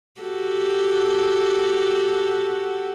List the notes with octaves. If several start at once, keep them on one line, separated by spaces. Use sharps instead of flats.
F#4 G4 A4